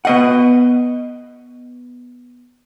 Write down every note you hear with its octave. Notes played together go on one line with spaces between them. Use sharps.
B3 D#5 F#5